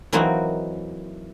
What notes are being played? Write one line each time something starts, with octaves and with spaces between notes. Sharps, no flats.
E3 F#3 A#3 C4 D#4 F#4